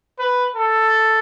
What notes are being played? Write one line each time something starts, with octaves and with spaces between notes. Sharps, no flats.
B4
A4